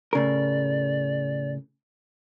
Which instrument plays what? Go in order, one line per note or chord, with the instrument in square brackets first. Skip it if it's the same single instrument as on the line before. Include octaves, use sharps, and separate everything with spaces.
[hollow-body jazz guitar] A2 C#3 A#4 [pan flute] D5